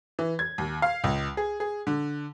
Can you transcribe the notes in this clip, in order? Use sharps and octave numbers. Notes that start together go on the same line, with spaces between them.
E3
G#6
D#2
F5
C#2
G#4
G#4
D3